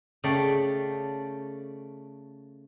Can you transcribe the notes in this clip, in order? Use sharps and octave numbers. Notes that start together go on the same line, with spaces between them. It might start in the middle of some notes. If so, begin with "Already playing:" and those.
C#3 A3 D5 G5